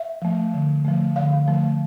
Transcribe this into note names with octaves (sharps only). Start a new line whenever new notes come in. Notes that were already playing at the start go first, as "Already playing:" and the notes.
Already playing: E5
F3 A3
D3
F3 A3
D3 F5
F3 A3